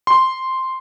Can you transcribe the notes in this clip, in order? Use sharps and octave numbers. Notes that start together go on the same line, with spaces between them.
C6